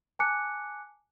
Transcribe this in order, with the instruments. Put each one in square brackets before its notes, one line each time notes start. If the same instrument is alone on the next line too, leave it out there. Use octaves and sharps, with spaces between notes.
[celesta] G#5 A5 D6 F#6 C#7